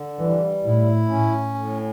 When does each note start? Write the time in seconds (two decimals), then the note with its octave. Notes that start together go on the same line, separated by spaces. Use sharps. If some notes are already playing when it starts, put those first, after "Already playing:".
Already playing: D3
0.18 E3 G3
0.63 A2 E4
1.09 C#4
1.54 A2